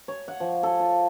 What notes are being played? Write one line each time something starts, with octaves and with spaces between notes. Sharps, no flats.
C#5
F#5
F3
A4
F4